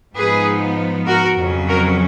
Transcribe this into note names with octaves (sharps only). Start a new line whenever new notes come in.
G#2 F3 B3 D#4 G#4 B4
F#4 A#4
F2 C#3 F#3 C#4
F#4 A#4